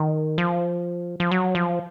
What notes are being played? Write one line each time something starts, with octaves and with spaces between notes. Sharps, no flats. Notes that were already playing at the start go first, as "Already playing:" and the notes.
Already playing: D#3
F3
F3
F#3
F3